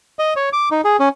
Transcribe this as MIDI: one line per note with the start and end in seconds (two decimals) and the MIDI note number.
0.19 0.34 75
0.36 0.49 73
0.53 0.69 86
0.71 0.81 63
0.85 0.97 68
1.00 1.09 61